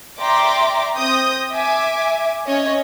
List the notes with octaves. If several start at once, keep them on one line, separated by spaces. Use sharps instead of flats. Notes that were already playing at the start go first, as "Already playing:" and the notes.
D5 E5 G5 A#5 C6 D6
C4 D#6 G6 A#6
E5 G#5 D6
C#4 C#5 D#5